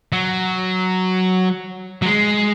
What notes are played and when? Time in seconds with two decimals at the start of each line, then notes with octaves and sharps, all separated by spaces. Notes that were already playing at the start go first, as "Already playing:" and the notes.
0.12 F#3
2.02 F#3
2.06 G#3